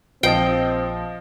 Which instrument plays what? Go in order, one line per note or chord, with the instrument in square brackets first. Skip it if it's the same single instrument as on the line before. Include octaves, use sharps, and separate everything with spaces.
[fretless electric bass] A#1 [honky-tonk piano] F3 D#5 C7 [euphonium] C4 [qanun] G5